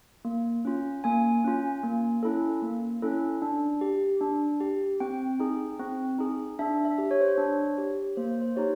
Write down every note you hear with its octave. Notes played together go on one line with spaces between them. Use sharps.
A#3
C#4 F4
A#3 G#5
C#4 F4
A#3
C#4 E4 A4
A#3
C#4 E4 A4
D4
G4
D4
G4
C4 G5
D#4 G#4
C4
D#4 G#4
D4 E5
E5
G4
C#5
C5
C#5
D4
G4
A#3 C5
C5
D#4 G4 C#5